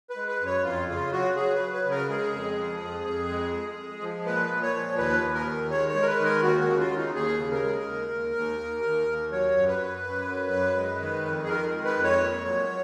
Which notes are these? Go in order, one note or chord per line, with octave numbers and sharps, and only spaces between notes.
B4
G#3
B4
F#2
C#5
F2 F4
C#3 F4
F#3 F#4
F#3 G#4
B4
F#3
B4
C#3
A#4
G#3 G#4
F2
F3
F2
F2
G#3
G#3
G#3
F3
A#2 B4
A#2
C#5
F3
D#2 B4
D#2
A#4
D#3
G#3 C#5
C#5
G#3
A#4
B4
D#3
A#4
D#2 F#4
F#4
C#3
F4
D#2
D#4
D#2 G#4
C#3
A#4
G#3
D#2
D#2
D#2
D#2
D#2
D#2
F#3 C#5
F#2
B4
F#2
F#2
F#3
F#2
G#3
D#3
F2
G#4
D#3 A#4
G#3
B4
F2
C#5
A#2
F#3